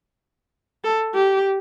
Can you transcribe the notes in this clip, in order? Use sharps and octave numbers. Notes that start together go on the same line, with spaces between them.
A4
G4